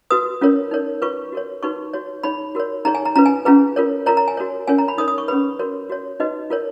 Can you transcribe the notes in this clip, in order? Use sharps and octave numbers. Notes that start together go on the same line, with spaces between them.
F#4 B4 D#6
C#4 F4 A#4 C#5
D#4 A#4 C#5
F4 B4 C#6
F#4 A#4 C#5
D#4 F#4 B4 C#6
F#4 C#5
D#4 G#4 C#5 B5
F#4 A#4 C#5
D#4 G#4 C#5 A#5
G#5
A#5
C#4 F4 B4 A#5
G#5
C#4 F4 G#4 B4 A#5
F4 A#4 C#5
F4 A#4 C#5 A#5
A#5
G#5
F#4 A#4 C#5
C#4 F4 A#4 C#5 G#5
A#5
B5
D#4 A#4 C#5 D#6
D#6
C#6
C#4 G#4 B4 B5
F#4 A#4 C#5
F#4 C#5
D#4 F#4 B4 D#5
F4 A#4 C#5